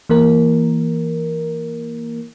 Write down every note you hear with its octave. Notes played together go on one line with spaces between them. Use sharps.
E3 A#3 A#4